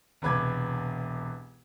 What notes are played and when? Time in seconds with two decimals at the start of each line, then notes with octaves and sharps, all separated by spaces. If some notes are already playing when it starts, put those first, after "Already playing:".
0.22 E1 C2 B4 D6 G#6